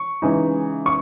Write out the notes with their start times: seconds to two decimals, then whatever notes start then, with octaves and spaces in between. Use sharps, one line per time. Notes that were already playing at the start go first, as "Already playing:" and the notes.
Already playing: C#6
0.22 C#3 E3 G#3 D#4
0.86 C#6